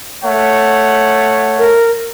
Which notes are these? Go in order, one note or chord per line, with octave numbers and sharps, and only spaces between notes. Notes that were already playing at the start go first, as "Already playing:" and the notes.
A3 C#5 F#5
A#4